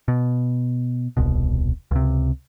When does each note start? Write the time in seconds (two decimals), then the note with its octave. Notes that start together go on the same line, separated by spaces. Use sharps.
0.08 B2
1.17 D#1 C2 B2
1.91 C#2 C3